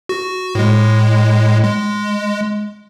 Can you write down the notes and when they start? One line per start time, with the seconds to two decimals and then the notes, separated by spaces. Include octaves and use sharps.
0.09 F#4
0.55 A2 G#3
1.64 G#3